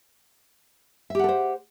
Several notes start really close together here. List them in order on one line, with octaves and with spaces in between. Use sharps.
E5 G4 F#5 A4 C5